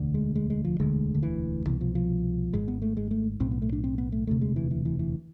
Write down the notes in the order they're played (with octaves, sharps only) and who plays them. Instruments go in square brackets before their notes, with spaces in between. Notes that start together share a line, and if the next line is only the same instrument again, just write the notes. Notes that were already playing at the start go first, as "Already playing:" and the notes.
Already playing: [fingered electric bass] E1 D2 D3
G#3
G#3
G#3
F3
E1 D2 D3 G#3
D3
E3
C2 B2 E3
F3
F3
G#1 G#2 G#3
B3
A3
G#3
A3
B1 A2 C4
B3
A3
D4
C4
B3
A3
E1 D2 C3 A3
G#3
E3
E3
E3
E3